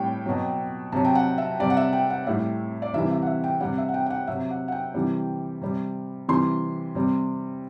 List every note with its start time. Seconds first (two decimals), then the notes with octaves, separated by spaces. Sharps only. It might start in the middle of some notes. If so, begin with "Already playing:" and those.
Already playing: A2 G3 G5
0.26 B2 F#3
0.92 C3 F#3 A5
1.05 G5
1.15 F#5
1.38 E5
1.60 C3 G3 D5
1.70 F#5
1.77 E5
1.93 G5
2.10 F#5
2.27 A2 G3 E5
2.82 D5
2.94 C3 E3 G3 E5
3.11 E5
3.22 F#5
3.27 E5
3.44 G5
3.60 C3 G3 F#5
3.78 E5
3.89 F#5
3.94 G5
4.06 G5
4.10 F#5
4.27 C3 F#3 E5
4.50 F#5
4.68 F#5
4.72 G5
4.94 C3 E3 G3
5.62 C3 G3
6.28 C3 E3 G3 C6
6.95 C3 G3